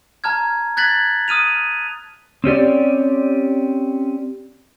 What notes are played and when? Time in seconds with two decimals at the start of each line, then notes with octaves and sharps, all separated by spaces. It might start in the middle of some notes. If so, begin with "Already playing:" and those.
0.24 A5 A#5 F6 G#6
0.77 F#6 G#6 A6 B6 F#7
1.28 D#6 F6 D#7 F7
2.44 C4 C#4 G4 D5